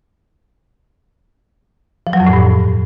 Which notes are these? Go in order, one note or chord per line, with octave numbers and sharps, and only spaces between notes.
F3
F#3
F2
A2
G2